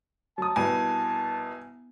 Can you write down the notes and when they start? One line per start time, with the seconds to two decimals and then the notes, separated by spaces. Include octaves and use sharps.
0.38 F#3 A5 D#6
0.56 C2 B2 B3 G#5